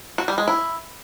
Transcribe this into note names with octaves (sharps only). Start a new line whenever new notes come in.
F#4
G3
G#3
E4